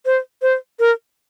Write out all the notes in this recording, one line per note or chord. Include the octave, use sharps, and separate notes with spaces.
C5
C5
A#4